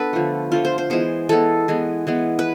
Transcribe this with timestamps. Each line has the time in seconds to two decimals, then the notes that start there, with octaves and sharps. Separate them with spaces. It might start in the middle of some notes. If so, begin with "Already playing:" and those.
Already playing: B3 D4 A4 B4
0.13 D3 F3 A3
0.52 D3 F3 A3 F4
0.65 C5
0.78 C5
0.90 E3 G#3 B3 C5
1.29 E3 G#3 B3 A4
1.68 E3 G#3 B3
2.07 E3 G#3 B3
2.39 B4